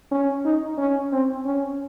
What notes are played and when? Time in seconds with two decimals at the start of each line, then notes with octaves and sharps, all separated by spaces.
0.11 C#4
0.45 D#4
0.78 C#4
1.12 C4
1.46 C#4